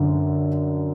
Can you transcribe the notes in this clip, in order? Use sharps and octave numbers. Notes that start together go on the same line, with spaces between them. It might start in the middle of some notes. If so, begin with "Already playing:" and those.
Already playing: F#2 D3